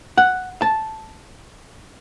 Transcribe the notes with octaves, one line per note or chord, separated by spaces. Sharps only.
F#5
A5